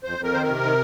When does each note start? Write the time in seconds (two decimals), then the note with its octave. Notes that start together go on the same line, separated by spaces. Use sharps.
0.04 F2 C5
0.18 F2
0.24 A#4
0.33 D#3 C5
0.43 A#4
0.48 C3
0.63 D#3